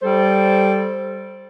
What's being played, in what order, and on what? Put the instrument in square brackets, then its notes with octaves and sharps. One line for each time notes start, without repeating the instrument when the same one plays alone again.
[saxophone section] G3 A4 C5